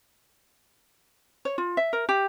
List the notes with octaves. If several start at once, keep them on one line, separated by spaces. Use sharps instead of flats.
C#5
F4
E5
A#4
G4